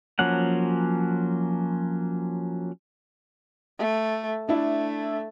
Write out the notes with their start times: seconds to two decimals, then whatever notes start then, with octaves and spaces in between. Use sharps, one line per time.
0.19 F3 F#3 A#3 C#4 F#5
3.78 A3
4.49 A3 D4 E4